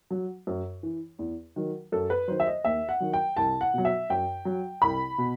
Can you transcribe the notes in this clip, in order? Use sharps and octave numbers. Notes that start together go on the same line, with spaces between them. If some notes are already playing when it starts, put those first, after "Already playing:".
F#3
F#2
E3
E2
D#3 F#3
F#2 A4
B4
D#3 F#3 C5
E5
D#5
D#2 E5
F#5
D#3 F#3
G5
C2 A5
F#5
B2 F#3
E5
F#2 G5
F#3
C2 B5
B2